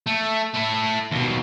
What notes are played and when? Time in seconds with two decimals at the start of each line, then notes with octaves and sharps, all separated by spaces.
0.07 A3
0.54 A3 E4
1.11 D#2 B2